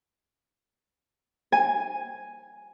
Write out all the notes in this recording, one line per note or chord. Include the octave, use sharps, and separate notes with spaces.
G#5